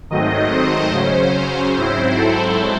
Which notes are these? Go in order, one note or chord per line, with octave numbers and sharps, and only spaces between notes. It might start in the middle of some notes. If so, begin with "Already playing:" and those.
G#2 D#3 F#3 A3 C4 D#5
C5
C#3 F#3 C#4 C5
G#2 F#3 C4 E4 C5
A4